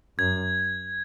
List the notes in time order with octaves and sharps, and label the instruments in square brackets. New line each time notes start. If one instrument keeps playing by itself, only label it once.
[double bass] F#2 [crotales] G#6